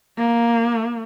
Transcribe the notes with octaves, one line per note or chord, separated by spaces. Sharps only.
A#3